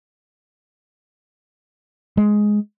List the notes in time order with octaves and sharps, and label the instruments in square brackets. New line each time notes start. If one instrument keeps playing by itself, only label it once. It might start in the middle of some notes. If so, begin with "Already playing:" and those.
[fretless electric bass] G#3